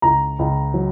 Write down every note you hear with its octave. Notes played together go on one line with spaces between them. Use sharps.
C#2 A#5
C#2
F#3